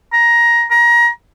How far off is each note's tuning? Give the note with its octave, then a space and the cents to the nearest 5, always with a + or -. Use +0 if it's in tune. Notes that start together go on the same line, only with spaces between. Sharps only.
A#5 +15
A#5 +25